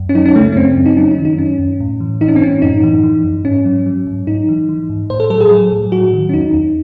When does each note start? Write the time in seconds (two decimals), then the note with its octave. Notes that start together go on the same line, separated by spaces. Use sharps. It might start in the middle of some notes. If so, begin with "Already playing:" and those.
Already playing: F#2
0.09 C#4
0.15 F#3 D#4
0.26 C#4
0.36 C#3 A3
0.46 A3
0.52 C#4
0.56 F#2 C4
0.77 F#2
0.86 D#4
0.97 F#3 C#4
1.11 D#4
1.18 D#3
1.25 D#4
1.38 F#2 C#4
1.59 F#2
1.80 A2
2.00 E3
2.21 E3 D#4
2.28 C#4
2.36 C4
2.42 A2 C#4
2.62 F#2 D#4
2.83 E3
3.03 E3
3.24 F#2
3.45 G#2 C#4
3.65 F#3
3.86 F#3
4.07 G#2
4.27 G#2 D#4
4.49 E3
4.69 E3
4.90 G#2
5.10 A2 C5
5.20 A4
5.30 F#3 A4
5.40 G#4
5.51 F#3
5.72 A2
5.92 F#3 F#4
6.13 D#3
6.29 C#4
6.33 E2 D#4
6.54 E2